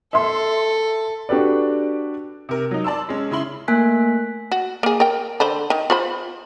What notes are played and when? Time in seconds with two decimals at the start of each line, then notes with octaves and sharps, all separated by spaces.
0.13 A4 E5 C6
1.29 D4 F#4 G4 A4 B4 D5
2.49 C3 A#4
2.71 F#3 D#4
2.84 D5 A5 C6 E6
3.09 G#3 C#4
3.31 C#3 E4 B5 C6 F#7
3.68 A3 A#3 A#4 G#5 F#6 B6
4.51 F#4
4.83 A#3 G#4
5.00 A#4 G5
5.40 D3 C5 B5
5.70 D#3
5.90 F4 C5 B5